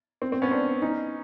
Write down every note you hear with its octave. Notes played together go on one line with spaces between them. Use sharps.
C4
C4
B3 C#4
C4 D4
C#4 D#4